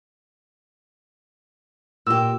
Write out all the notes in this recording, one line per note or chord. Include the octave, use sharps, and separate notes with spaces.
A#2 G4 E6